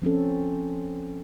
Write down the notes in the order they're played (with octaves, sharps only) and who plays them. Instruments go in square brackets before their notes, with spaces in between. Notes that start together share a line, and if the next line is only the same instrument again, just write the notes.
[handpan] F3 C4 C#4 A4